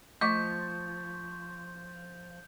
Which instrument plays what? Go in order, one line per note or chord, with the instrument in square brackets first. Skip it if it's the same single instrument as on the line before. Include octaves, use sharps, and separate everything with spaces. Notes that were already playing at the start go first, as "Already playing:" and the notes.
[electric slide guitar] F3 [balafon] A3 D#5 D6 [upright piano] C#6 B6 [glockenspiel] G6